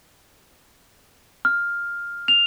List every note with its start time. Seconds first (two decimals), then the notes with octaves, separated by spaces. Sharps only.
1.45 F6
2.28 F7